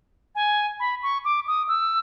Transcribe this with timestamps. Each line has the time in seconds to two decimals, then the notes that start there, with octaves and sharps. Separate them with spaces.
0.35 G#5
0.80 B5
1.03 C#6
1.25 D6
1.47 D#6
1.68 E6